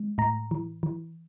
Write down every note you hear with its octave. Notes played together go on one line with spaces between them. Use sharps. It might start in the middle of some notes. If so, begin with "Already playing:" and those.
Already playing: G#3
A2 A#5
E3
E3